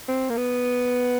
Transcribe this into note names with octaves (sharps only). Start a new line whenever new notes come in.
C4
A#3
B3